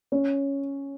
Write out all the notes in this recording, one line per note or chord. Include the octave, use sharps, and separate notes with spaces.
C#4